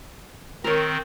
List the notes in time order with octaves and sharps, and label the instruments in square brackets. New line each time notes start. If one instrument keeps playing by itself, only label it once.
[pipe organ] D#3 C4 [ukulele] A#4 C#5